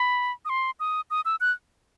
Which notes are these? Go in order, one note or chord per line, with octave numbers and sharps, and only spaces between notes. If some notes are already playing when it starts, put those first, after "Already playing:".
Already playing: B5
D#6
C6
D#6
D#6
E6
F#6